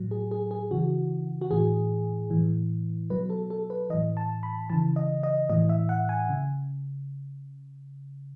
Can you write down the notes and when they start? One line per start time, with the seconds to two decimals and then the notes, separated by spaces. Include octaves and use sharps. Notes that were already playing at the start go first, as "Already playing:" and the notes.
Already playing: A2 F#3
0.11 G#4
0.31 G#4
0.51 G#4
0.71 C#3 E3 F#4
1.41 F#4
1.51 A2 E3 G#4
2.30 A2 E3
3.10 B2 F#3 B4
3.30 A4
3.50 A4
3.70 B4
3.90 E3 D#5
3.94 A2
4.17 A5
4.43 B5
4.70 C#3 E3 A5
4.96 D#5
5.23 D#5
5.50 A2 E3 D#5
5.69 E5
5.89 F#5
6.09 G#5
6.29 C#3